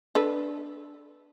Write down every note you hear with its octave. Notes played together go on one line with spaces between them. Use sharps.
D4 A4 B4